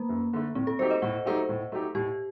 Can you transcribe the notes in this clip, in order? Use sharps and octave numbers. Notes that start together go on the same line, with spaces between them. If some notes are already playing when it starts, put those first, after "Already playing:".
Already playing: A3 A#3
F#2
D3 A3
A2 C4
A4
F#3 A3 D#4 G4 C5
D#5
A2 F#5
F#3 A3 D#4 G4
A2
F#3 A3 D#4 G4
A2 G4